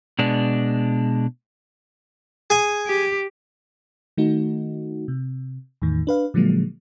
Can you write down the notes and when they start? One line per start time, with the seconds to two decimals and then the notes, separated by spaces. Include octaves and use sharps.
0.19 B2 G#3 D4
2.50 G#4 G#5
2.87 G4
4.17 D#3 A3 D#4 F#4
5.08 C3
5.82 E2 A2 D#3
6.07 D4 B4 F5
6.34 A#2 D3 F3 F#3 G#3 A#3